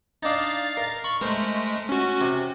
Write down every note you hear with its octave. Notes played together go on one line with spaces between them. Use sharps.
D4 D#4 F5 A6
A#4
B5 C#6
G#3 A3 A#4 C5
C#4 F#4
C3